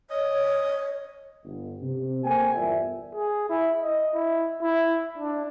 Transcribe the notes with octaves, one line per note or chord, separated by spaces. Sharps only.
C#5 D#5
G1
C3
A#3 A4 C5 G5 G#5
G1 E2 F4 A#4 D5 E5
G#4
E4
D#5
E4
E4
D4